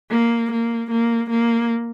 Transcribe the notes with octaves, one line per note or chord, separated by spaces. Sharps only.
A#3
A#3
A#3
A#3